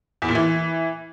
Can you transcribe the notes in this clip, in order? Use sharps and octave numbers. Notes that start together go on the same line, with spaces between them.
E2
A#2
E3